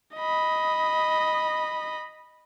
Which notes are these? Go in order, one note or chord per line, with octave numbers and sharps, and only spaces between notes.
D#5 B5